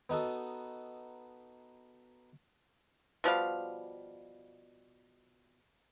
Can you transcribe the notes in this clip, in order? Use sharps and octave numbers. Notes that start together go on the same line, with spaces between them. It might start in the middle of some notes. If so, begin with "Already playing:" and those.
B3 D#4 F#4 A4
B2 F3 G3 F5